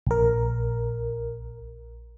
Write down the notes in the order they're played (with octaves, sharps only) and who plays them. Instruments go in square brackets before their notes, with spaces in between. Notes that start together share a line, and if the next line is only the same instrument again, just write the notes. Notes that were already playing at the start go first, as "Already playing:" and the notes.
[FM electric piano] A#1 A#4